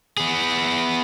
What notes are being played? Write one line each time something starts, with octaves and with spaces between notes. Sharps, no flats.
B3 G#4